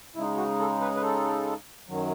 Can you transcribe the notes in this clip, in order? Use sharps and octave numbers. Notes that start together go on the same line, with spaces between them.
C#3 G#3 D#4 E4
F#4
A4
B4
B4
A4
F#2 D#3 F#3